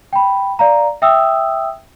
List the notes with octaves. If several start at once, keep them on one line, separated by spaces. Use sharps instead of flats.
G5 B5
D5 F5 A#5
E5 G5 D#6 E6